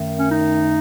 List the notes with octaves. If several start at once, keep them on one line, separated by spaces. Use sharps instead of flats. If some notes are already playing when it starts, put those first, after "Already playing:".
Already playing: F#2 D#3 A3
C#4
D#4